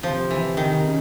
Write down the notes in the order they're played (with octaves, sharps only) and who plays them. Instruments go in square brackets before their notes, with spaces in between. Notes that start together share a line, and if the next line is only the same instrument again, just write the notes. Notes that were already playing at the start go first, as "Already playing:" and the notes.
[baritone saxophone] C3 [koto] F3
[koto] E3
D#3
[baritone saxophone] C#3